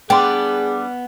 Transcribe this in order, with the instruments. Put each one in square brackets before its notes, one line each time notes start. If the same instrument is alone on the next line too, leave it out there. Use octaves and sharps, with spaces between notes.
[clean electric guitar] G3 D4 D5 [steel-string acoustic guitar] B3 [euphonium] G#4 [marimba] G5 C6